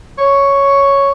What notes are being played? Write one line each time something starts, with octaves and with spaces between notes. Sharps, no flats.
C#5